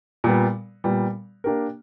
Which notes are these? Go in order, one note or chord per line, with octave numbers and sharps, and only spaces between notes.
A#2 G3 B3
A#2 G3 B3
A#3 D4 G4 A#4